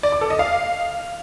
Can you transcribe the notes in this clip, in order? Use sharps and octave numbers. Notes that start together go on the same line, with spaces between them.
D5
D6
A4
D#5
F5